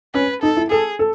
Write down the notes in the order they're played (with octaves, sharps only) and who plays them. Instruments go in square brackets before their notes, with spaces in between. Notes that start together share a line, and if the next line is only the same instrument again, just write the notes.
[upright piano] C#4 [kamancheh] B4
[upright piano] D#4 [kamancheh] A4
[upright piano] E4
[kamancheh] G#4 [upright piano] A4
[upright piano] A4